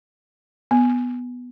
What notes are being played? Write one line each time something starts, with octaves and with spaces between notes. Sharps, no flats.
B3